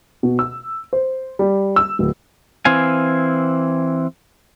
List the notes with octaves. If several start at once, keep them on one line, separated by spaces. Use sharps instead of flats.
B2
E6
C5
G3
E6
D1
E3 C4 F5 G#5